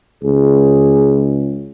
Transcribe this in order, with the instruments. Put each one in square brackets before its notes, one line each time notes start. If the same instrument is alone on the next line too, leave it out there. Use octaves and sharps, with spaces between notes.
[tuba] C#2 [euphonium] G#4